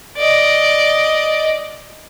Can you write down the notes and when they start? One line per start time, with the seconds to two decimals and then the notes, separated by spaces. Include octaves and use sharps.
0.17 D5 D#5